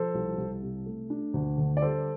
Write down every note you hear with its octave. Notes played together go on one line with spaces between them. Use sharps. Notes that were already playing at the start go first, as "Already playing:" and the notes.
Already playing: F3 A4 C5
C2
C2
C3
A3
D4
D2
D3
D5
G3 A4 C5